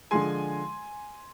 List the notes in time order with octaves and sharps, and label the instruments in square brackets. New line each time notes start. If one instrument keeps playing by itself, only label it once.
[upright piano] D3 F3 G#3 G#5 C6